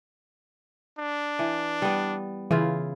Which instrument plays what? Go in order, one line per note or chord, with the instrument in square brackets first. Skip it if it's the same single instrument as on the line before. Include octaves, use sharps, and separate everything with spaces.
[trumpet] D4
[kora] E3
G3 B3
[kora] C#3 E4 F4 [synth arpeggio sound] E3